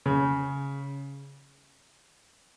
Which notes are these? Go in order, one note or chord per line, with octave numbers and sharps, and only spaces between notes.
C#3